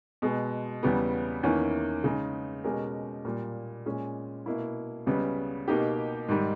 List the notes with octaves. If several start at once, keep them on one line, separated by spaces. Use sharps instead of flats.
B2 G#3 B3
E2 C#3 G3 B3
E2 D#3 A#3 C#4 E4
C#3 G#3 D#4
B2 G#3 C#4 G4 A#4
A#2 G3 A#3
A#2 G#3 C#4
B2 A#3 E4
C#2 C#3 G3 B3
B2 A#3 D#4 G4
G#2 D#3 G3